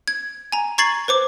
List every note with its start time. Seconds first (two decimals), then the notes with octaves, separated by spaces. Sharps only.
0.08 G#6
0.52 G#5 A#5
0.78 A#5 C#6 G#6 A6 C7 F#7
1.08 B4 C5 D6